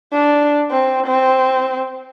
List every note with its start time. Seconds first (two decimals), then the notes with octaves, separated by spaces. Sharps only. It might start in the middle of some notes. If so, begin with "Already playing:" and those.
0.12 D4
0.71 C4
1.06 C4